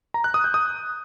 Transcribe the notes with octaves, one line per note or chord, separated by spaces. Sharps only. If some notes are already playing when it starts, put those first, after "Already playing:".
A#5
F#6
D#6
G6
D#6